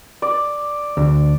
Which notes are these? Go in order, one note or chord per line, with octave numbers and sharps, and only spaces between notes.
D5
D2